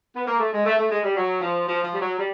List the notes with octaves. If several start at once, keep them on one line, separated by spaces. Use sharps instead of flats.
B3
A#3
A3
G#3
A3
A3
G#3
G3
F#3
F3
F3
F3
G3
F#3
G3